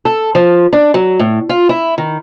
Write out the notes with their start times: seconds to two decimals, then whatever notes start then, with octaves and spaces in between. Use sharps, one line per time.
0.05 A4
0.35 F3
0.73 D4
0.94 F#3
1.19 A2
1.49 F4
1.69 E4
1.98 D#3